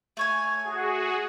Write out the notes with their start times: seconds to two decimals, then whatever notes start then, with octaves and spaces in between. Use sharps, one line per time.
0.17 A3 C#5 G#5
0.62 F#4 G#4